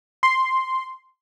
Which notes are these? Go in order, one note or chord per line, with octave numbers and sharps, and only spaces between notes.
C6